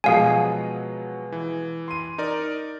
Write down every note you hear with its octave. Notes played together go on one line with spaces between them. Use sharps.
B2 F3 F#3 G#3 G#4 F5 G#5
E3
C6 D#7
D#4 A#4 D5